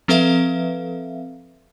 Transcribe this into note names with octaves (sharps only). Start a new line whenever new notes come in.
F3 C4 A4 B4 E5 F5